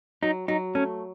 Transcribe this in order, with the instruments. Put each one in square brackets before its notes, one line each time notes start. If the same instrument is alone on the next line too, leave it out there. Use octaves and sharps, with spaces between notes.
[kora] F#3 [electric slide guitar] D#4
[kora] F#3 [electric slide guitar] D#4
[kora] A3 [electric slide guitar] C#4